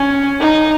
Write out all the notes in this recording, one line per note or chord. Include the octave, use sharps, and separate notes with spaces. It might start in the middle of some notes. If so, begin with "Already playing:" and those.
Already playing: C#4
D#4